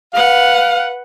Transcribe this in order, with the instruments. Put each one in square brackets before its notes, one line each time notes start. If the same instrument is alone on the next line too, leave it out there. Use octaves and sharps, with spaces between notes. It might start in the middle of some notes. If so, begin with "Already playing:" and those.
[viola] B4 F#5 [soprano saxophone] F5